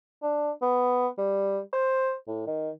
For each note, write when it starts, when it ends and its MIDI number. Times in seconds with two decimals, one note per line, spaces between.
0.23 0.51 62
0.62 1.08 59
1.18 1.60 55
1.73 2.15 72
2.27 2.46 45
2.47 2.70 51